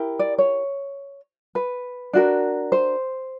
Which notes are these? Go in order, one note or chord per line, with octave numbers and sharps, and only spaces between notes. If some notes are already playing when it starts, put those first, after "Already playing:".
Already playing: E4 G4 A#4
D5
C#5
B4
D4 F#4 A#4
C5